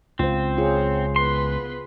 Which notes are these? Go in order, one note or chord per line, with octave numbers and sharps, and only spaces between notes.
C#2 C4 F4 C5
F4 G#4 C#5
B3 B4 C6